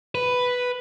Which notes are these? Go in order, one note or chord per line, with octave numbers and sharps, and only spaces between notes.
B4